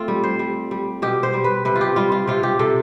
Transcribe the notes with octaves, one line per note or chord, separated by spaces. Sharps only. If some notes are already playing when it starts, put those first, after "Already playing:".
Already playing: A3 C4 F4
G3
C5
G3
G3
B2 G4
C5
G3
B4
C3 B4
F4
G4
G3 F4
F4
C3 F4
G4
C3 A4